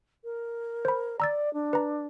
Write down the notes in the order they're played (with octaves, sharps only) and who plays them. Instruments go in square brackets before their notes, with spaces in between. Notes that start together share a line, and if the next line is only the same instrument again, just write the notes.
[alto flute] A#4
[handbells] C5 B5
[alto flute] D5 [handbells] A#5 E6 A6
[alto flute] D4
[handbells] B4 A#5